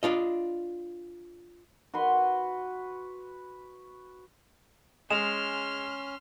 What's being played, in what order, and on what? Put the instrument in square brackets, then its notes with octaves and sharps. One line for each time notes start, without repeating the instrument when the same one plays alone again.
[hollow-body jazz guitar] D4 F4 D#5
[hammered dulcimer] F#4 B4 C6
[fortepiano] G#3 [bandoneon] C#4 [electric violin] C6 F6 [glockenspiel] E7 F7